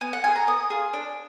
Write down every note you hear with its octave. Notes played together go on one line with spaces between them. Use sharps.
B3 G#5
F#5
F4 G#5
G#4
A#5
B3 D#6
F4 G#4
D4